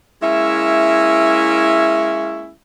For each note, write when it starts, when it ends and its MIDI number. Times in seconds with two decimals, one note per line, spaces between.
0.22 2.52 56
0.22 2.52 58
0.22 2.52 61
0.22 2.52 64
0.22 2.52 76